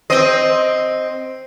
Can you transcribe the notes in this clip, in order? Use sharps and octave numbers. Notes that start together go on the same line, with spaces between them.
C4 D#5